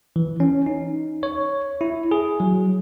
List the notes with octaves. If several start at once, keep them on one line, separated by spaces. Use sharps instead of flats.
E3
C#4
D#4
C#5
E4
G#4
F#3